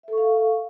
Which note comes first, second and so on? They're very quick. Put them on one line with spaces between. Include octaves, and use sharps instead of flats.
E5 A4 C#6 F5